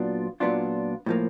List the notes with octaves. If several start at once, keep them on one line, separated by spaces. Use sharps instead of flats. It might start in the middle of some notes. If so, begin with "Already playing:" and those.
Already playing: A#2 F#3 B3 D4 F4
A#2 F#3 B3 D4 F4
A2 F3 A#3